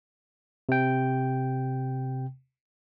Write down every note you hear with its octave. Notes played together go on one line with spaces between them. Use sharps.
C3 G5